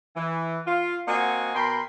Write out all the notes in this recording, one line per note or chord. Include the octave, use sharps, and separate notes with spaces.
E3
F4
A#3 C4 F#4 D#5 F#5 G#5
B2 A#4 G5 B5 C6